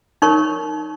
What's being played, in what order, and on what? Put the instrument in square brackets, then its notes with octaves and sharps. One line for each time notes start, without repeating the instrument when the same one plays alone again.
[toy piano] D#4 A#4 C#5 C#6